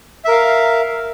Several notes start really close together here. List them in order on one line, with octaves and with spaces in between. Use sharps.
E5 A#4 F5